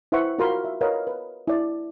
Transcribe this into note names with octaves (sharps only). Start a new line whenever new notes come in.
E4 B4 C5 E5 F#5 C#6
F4 F#4 A#4 F5 B5 C6
E5
A#4 B4 C#5 D#5 F5 F#5
B4
E4 D5